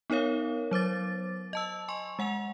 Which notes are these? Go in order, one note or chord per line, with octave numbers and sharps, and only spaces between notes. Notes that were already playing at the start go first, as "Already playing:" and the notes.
B3 D#4 A#4 C#5 F5
F#3 C5 D6 A6
D#5 A5 E6
G#5 C6 C#6
G#3 F#5 G#5 F7